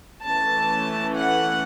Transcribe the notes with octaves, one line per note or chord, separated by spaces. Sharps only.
E3 A3 C#4 A5
F#5